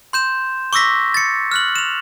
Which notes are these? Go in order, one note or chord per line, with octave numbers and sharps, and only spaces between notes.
C6 G6 E7
C#6 D6 E6 A#6 B6
A6 C#7
F6 F#6 F#7
E7 F7